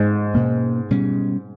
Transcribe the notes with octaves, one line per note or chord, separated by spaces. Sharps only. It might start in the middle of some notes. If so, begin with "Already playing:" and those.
Already playing: G#2
B2 A#3 C#4
B2 G3 C#4